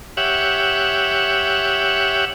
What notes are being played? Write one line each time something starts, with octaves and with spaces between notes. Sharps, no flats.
G4 C#5 E5 F#5